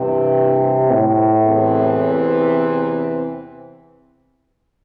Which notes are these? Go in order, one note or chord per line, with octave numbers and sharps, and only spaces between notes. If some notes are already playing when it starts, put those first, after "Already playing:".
Already playing: G2 C3 E3 C4
A2
E2 C3 E3 C4